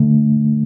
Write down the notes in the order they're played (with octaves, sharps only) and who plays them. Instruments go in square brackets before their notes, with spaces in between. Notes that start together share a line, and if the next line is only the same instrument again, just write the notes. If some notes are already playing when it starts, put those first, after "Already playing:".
Already playing: [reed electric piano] D3 A3